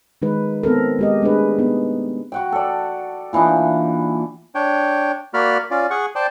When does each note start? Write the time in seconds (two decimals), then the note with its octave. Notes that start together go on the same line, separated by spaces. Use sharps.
0.22 D#3 G#3 D#4 B4
0.63 B3 C4 A4 A#4
0.99 G#3 G4 D#5
1.22 G#3 A3 D4 G#4 B4
1.59 B3 D#4
2.32 F#4 F#5 G5
2.52 A4 D5
3.33 A#2 E3 D4 D#4
4.55 D4 C#5 G5
5.34 A#3 F#4 D5 B5 F6
5.71 C#4 F4 D5
5.91 G#4 F#5 C#6
6.15 C5 D5 G5 A5